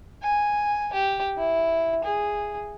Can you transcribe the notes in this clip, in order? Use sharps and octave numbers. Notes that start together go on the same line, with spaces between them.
G#5
G4
E4
G#4